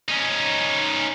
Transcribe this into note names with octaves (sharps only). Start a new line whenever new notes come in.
C#4 D#4